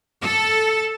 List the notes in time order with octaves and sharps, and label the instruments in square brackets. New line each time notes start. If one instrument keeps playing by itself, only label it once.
[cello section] A4